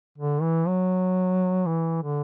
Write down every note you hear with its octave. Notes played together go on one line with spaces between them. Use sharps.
D3
E3
F#3
E3
D3